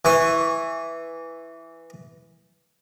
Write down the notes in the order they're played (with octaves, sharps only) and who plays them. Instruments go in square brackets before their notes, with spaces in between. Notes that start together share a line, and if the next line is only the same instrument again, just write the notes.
[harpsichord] E3 C#6